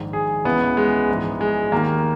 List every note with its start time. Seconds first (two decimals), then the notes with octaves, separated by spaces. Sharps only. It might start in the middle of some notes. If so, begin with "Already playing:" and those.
Already playing: A#1 G#2 D#3
0.13 G#4
0.45 C#2 C#3 E3 B3
0.77 G#3
1.08 A#1 G#2 E3
1.41 G#3
1.72 D#2 D#3 A#3